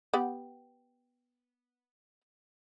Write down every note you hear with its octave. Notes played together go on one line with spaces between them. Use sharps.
B3 G4 F#5